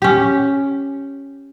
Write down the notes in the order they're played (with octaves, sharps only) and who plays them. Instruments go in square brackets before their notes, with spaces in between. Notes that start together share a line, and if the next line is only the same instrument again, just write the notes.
[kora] C#4 G4